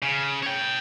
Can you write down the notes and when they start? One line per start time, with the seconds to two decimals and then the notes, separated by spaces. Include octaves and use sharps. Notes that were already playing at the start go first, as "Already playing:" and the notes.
0.02 C#3
0.43 C#5 G5